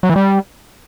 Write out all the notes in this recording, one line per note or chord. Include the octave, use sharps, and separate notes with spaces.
F#3
E3
G3